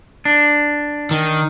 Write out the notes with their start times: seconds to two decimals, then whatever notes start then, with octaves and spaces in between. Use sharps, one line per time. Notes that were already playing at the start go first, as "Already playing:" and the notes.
0.25 D4
1.11 D#3